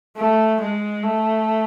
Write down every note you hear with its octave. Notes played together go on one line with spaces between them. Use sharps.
A3
G#3
A3